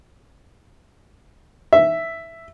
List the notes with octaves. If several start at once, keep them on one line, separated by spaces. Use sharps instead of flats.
E5